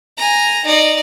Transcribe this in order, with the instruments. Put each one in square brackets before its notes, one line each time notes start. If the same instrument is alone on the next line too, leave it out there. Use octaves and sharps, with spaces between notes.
[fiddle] G#5 A#5
D#4 D5